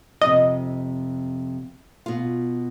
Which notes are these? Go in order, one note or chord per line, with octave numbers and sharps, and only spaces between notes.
F2 C3 D#5
B2 F4